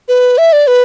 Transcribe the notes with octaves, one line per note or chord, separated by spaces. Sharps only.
B4
E5
D5
B4